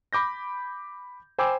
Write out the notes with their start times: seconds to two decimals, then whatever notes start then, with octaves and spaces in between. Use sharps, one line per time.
0.13 B5 D6 G6 A#6
1.38 C5 G5 G#5 B5 D6 E6